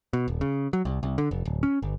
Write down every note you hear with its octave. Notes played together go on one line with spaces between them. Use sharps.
B2
D#1
C#3
F#3
C2
C2
D3
F1
D1
C#4
G1